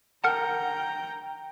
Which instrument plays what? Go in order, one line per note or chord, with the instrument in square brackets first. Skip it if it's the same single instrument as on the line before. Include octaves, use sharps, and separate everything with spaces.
[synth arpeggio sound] A#4 F#5 A5 [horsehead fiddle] G5 A#5